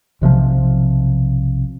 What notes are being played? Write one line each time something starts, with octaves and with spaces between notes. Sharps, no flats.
B1 C3 E3 F3